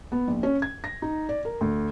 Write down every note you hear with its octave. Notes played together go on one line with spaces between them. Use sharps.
B3
A#1
C#4
G#6
A#6
D#4
D5
A#4
D2